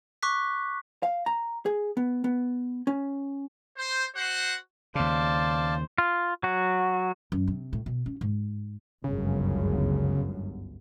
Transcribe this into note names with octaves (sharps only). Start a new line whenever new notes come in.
C#6 D6 F#6 B6
F5
A#5
G#4
B3
B3
C#4
C5
F#4 C5 F#5
D#2 C#3 C5 D5 F5 A5
F4
F#3 F#4
F#2
C3
A2
B2
C#4
G#2
G1 C#2 F#2 C#3